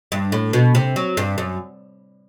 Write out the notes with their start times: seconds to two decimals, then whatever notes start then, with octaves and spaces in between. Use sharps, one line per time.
0.12 G2
0.32 A2
0.53 B2
0.75 C3
0.96 F#3
1.17 G2
1.38 F#2